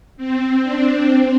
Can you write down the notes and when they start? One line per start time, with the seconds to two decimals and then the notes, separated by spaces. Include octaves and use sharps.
0.17 C4
0.63 D4
1.08 C4